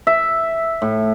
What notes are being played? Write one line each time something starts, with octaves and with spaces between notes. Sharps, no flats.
E5
A2